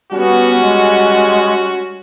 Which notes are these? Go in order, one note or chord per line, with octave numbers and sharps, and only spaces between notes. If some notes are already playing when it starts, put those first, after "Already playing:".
G3 B3 C#4 F#4
G#3